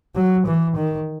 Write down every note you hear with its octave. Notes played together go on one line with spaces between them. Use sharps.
F#3
E3
D#3